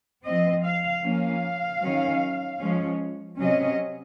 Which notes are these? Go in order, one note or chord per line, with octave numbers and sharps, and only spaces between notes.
F3 C4 D#5
F5
F3 A#3 C#4 F5
D#3 F#3 C#4
F3 G#3 C#4
C3 F#3 C#4 D#5